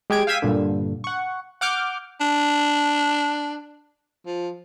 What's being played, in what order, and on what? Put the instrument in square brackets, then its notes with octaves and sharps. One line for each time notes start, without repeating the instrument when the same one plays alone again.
[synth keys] G#3 G4 G#4 G#6 D7
F5 G5 E6 G#6 B6 D#7
G2 A#2 D3
F#5 C#6
F#5 D6 F6 G6
[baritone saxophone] D4
F3